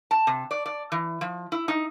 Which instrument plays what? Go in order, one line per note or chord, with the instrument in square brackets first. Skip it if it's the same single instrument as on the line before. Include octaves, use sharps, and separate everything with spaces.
[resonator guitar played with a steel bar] A5
C3
D5
D5
E3
F3
E4
D#4